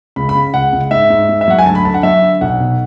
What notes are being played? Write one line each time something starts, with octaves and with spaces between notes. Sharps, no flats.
C#2 B5
B5
C#3
C#2 F#5
C#2
G#2 E5
G#2
G#2
E5
F#3 F#5
G#5
D2 A5
B5
D3 A5
F#5
F#3 E5
D3
B1 F#5
B2